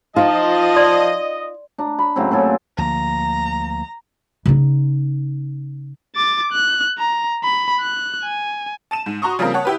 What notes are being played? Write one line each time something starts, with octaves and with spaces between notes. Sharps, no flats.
F3 D#4 F4 D#5 A5
D5 C6
D4 A#5
B5
A2 C#3 F#3 C4
A#2 F#3 A4 G#5
D2 F3 A#3 A#5
C#3 D#4
D6 A6
F#6
A#5
B5
F#6
G#5
A5 D#7 E7
G#2
F#4 A#5 C6 C#6 D#6
C#3 F3 G3 A#3 C4 A#4
C#5 F#5 A5
E4 G4 B4